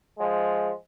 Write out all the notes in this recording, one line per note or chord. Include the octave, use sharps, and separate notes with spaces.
F3 G#3